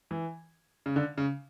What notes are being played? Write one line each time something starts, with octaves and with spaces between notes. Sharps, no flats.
E3
C#3
D3
C#3